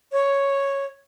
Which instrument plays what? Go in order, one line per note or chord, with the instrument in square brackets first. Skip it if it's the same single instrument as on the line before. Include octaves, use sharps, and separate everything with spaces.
[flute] C#5